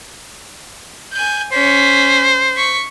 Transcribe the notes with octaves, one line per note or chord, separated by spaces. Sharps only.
G#5 G6
C#4 C5 B6
C#6 B6